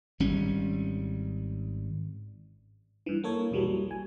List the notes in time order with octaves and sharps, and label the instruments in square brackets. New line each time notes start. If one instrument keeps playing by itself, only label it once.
[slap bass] G#1 G3 C#4
[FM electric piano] G2 E3
A#3 A4 C#5
B1 E2 E3 F#3 G3
G3
G#5